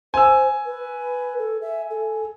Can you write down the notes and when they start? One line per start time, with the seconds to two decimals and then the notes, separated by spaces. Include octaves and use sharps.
0.14 C5 G#5 E6
0.65 B4
1.38 A4
1.61 E5
1.90 A4